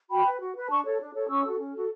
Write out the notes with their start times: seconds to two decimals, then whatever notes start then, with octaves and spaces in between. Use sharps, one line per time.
0.10 F#4 G5 B5
0.25 B4
0.40 F#4
0.55 B4
0.69 D4 A5 C#6
0.84 A4 C#5
0.99 D4
1.14 A4 C#5
1.29 C#4 C#6 E6
1.45 F#4 A4
1.58 C#4
1.73 F#4 A4